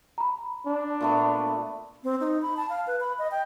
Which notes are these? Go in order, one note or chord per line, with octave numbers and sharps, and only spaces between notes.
A#5 B5
D4
A#2 A3 B3
C4
D#4
B5
A5
F5
B4
B5
D#5
G5